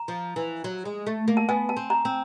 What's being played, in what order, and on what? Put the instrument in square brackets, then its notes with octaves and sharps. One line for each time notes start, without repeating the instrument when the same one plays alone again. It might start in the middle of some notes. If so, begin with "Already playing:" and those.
Already playing: [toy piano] A#5
[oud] F3
E3
F#3
G#3
A3
A#3
[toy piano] A5
[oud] B3 [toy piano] G#5
[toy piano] A5
[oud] C4
[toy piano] A#5
[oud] C4